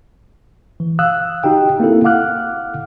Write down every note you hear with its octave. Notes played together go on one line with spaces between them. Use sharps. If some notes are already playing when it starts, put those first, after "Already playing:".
E3
F5 D#6 E6 F#6
D#4 F#4 G4 G5
A#3 C4 E4 A4
F5 F#5 D6 F6 F#6